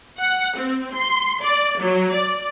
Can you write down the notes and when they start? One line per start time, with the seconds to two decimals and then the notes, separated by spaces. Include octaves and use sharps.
0.18 F#5
0.57 C4
0.94 C6
1.42 D5
1.80 F#3
2.13 D5